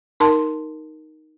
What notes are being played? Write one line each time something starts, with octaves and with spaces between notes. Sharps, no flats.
D#4 A#4 A5 C6